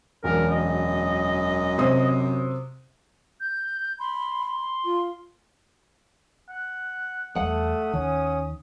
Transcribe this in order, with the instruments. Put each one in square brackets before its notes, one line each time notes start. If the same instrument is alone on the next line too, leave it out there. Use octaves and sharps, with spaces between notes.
[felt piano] E1 [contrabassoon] F#2 [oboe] A#4
[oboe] D#5
[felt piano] C3 C5 D#6
[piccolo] G6
[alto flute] B5 [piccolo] C6
[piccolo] C6
[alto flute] F4
[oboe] F#5
[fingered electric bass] E2 G3 [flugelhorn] A3 [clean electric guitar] F#5 [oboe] D#6
[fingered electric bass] D#2 D#3 [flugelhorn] C#4